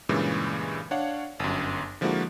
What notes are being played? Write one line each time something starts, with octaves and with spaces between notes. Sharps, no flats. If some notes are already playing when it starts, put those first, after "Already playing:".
G2 A#2 C#3 E3 G#3
D4 C#5 F5 F#5
G1 F#2
D3 F3 G#3 A#3 E4 F#4